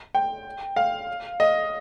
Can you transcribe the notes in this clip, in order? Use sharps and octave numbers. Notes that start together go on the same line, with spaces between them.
G5
F5
D#5